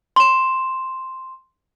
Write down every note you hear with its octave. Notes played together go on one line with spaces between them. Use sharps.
C6 E7